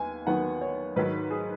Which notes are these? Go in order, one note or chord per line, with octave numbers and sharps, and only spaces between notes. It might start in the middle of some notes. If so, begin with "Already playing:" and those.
Already playing: D#2 B3 G#5
D#2 D#3 F#3 B3 F#5
C#5
G#2 D#3 F#3 B4
G#4